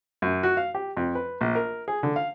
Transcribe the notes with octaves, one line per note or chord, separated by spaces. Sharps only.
F#2
F#4
F5
G4
F2
B4
A#1
A#4
G#4
D3
F5